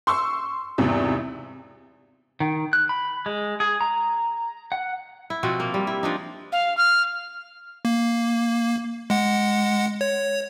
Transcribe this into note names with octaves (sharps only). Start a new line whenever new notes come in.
C6 C#6 E6
G#1 E2 C3
D#3
F#6
B5
G#3
G#4
A#5
F#5
E4
B2 F3 C4 F#4
A#3
G3
E4
F3 D4 D#4
F5
F6
A#3
G#3 F#5
C#5